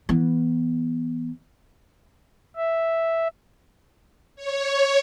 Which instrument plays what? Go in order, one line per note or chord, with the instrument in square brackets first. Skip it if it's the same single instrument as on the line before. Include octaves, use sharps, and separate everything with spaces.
[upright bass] E3 B3
[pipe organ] E5
[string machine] C#5